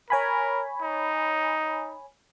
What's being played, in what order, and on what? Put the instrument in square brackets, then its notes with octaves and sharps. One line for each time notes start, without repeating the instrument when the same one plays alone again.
[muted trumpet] A#4 [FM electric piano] C#5 G#5 B5
[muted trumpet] D#4